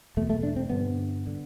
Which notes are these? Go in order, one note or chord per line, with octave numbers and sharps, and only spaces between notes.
E2 B2 A3
A3
D4
C4
G2 D3 B3
D3